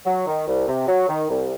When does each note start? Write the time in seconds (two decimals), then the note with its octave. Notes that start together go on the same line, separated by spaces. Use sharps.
0.05 F#3
0.26 D#3
0.47 C2
0.67 C3
0.87 F#3
1.08 D#3
1.29 C2